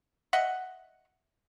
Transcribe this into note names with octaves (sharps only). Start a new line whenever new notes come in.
D#5 E5 F#5